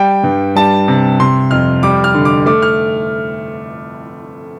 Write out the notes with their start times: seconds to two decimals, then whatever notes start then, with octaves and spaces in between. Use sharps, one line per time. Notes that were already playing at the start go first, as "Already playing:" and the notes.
Already playing: G3 G5
0.24 G2
0.56 G3 A5
0.88 C3
1.20 C3 C6
1.51 F2 F6
1.83 G3 D6
2.04 F6
2.14 D3
2.25 D6
2.46 A3 D6
2.62 F6